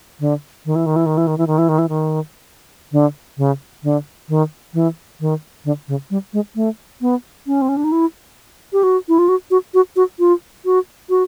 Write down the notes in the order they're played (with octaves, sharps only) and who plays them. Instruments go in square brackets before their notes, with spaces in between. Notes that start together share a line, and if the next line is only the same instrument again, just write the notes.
[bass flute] D3
D#3
E3
D#3
E3
D#3
E3
D#3
E3
D#3
E3
D#3
E3
D#3
D3
C#3
D3
D#3
E3
D#3
D3
C#3
G3
G#3
A3
B3
C#4
C4
C#4
D4
D#4
E4
G4
F#4
E4
F4
F#4
F#4
F#4
F#4
F4
F#4
F#4